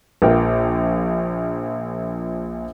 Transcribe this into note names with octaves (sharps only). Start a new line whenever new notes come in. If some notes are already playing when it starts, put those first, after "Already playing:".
A#1 A#2 F4 A#4 G5